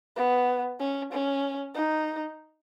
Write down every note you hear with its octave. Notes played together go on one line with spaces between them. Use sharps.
B3
C#4
C#4
D#4